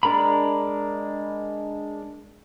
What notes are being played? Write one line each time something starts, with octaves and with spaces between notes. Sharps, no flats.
G#3 D4 A#4 A#5 B5